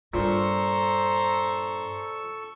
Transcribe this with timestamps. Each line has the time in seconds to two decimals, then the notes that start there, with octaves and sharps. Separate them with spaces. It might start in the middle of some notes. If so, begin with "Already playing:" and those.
0.14 G2 A#2 A4 C5 A#5 C#6 E6